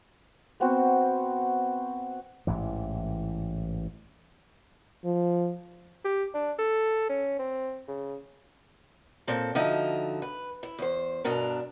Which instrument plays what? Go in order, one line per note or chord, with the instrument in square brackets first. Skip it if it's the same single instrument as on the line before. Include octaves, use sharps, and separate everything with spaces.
[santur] B3 C4 F#4
[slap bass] A1 G#2 E3
[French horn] F3
[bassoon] G4
D4
A4
C#4
C4
C#3
[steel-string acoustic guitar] A#2 C4 A4
D3 F3 D#4 F#4 E5
B4
E4
E2 C5
G2 B2 D4 A#4